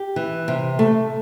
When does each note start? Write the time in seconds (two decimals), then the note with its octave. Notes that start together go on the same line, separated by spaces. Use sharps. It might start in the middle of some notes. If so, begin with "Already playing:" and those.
Already playing: G4
0.16 E3
0.48 C3
0.79 A3